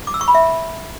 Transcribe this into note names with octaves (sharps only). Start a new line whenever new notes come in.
D6
E6
C#6
B5
E5